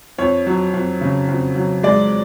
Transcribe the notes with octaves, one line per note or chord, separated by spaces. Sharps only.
F2 C#5
F#3
F2
C#3
F2
F#3
G#3 D5